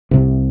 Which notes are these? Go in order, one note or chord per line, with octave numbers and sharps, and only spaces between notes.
C2 C3